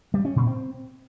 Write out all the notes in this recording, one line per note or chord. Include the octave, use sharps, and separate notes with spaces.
G3
C#4
A#2
C4